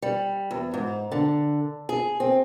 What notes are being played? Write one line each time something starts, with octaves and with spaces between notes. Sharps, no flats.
G3
E2
G#2
D3
G#4
C4